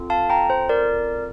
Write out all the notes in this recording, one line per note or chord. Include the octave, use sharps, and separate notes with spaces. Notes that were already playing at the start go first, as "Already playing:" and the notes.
Already playing: C4 F4 A4
F5 A5
G5 A#5
C5
A#4 D5